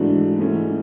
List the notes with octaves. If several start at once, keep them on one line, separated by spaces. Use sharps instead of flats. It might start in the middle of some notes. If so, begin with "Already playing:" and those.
Already playing: G#2 E3 A3 D4 F#4
G#2 E3 A3 C#4